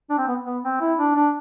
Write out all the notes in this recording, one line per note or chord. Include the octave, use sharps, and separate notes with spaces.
D4
C4
B3
B3
C4
E4
D4
D4